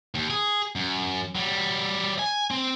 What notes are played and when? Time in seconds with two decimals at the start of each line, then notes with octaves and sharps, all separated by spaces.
0.15 D#2
0.30 G#4
0.76 F#2
1.35 F#3 G3
2.19 G#5
2.51 C4